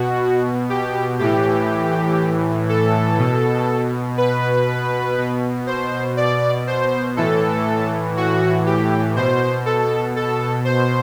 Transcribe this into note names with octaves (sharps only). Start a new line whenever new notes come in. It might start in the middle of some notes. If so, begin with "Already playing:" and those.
Already playing: B2 F#4
G4
A2 E3 G4
A4
B2
B4
B2
C5
D5
C5
A2 E3 A4
F#4
G4
B2 C5
A4
A4
C5